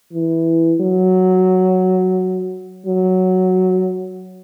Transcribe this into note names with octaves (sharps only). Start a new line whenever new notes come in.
E3
F#3
F#3